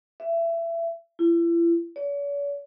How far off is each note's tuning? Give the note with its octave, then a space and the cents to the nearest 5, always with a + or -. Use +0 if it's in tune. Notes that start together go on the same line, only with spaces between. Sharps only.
E5 +25
E4 +40
C#5 +45